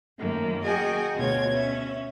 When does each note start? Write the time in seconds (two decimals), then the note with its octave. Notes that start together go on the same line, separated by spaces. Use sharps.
0.19 F#2 D#3 A3 A#3
0.63 F#4 G#4 A#4 D#5 G5 G#5
1.14 D2 B2 F4 C#5 G#6
1.53 C#4 E5